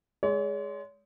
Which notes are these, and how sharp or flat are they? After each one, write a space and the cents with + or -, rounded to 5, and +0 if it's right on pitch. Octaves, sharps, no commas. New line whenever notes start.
G#3 +0 C#5 +40